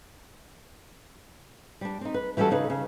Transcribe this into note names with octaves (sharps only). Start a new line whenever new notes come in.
G3 D4
C4 D#4
B4
E3 G3 C#4 F#4 A4
C#3 D#4 G#4 B4
C#3